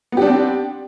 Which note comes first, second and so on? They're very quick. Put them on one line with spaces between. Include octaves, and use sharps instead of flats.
B3 G4 D4 C4